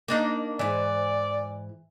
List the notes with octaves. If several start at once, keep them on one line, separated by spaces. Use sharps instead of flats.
A#3 D4 D#4
G#2 E3 D5